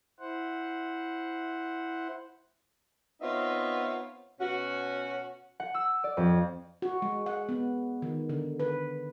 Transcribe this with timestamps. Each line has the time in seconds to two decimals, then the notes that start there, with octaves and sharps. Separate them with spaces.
0.20 E4 C5 F#5
3.21 B3 C4 D#4 F4 C#5 E5
4.40 B2 C#4 F#4
5.60 F#5
5.74 E6
6.04 D5
6.17 F2
6.82 F#4
7.02 G#3
7.26 F#5
7.49 B3
8.02 D#3
8.29 D3
8.60 B4